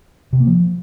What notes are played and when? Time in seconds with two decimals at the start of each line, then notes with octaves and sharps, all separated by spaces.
0.33 C3
0.40 A#3
0.47 F3